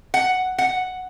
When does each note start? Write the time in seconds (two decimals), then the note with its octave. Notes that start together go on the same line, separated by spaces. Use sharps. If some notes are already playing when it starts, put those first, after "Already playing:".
0.14 F#5
0.58 F#5